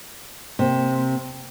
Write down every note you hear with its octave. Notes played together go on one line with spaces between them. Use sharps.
C3 A#3 C5